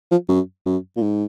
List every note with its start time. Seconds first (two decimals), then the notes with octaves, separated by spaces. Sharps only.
0.11 F3
0.29 F#2
0.66 F#2
0.96 A#2
1.02 G#2